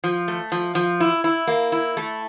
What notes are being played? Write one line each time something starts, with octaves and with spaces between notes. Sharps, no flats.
F3
A3
F3
F3
E4
E4
A#3
E4
A3